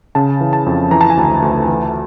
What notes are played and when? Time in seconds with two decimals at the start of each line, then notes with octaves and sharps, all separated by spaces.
0.15 C#3 A5
0.41 E3
0.53 A5
0.66 F2
0.91 E3 A#5
1.01 A5
1.10 G#5
1.17 D2 A5
1.42 D2
1.68 E3